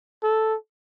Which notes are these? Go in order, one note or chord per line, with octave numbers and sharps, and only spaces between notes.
A4